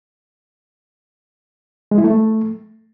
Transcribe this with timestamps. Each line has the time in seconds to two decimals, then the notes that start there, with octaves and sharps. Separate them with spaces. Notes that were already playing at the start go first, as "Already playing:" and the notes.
1.91 G#3
1.98 E4
2.04 A3